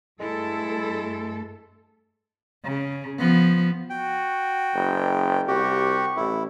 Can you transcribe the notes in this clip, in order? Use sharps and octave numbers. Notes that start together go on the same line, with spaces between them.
G2 G#3 A3 E4 A4
C#3
F3 B3
F#4 G5
F#1
C2 F#4 G4 C#6
A1 E4